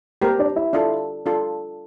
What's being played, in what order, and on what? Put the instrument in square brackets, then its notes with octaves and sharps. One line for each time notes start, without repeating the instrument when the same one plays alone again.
[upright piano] A#3 A#4 [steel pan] G4 C5 G5 A#5
[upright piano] D4 D5
E4 E5
[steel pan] D4 F4 A4
D4 F4 A4